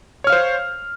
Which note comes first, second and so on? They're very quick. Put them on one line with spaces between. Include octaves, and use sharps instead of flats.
C#5 F6 F5 C5